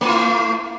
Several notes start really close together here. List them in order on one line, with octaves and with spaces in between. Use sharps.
A3 F4 E4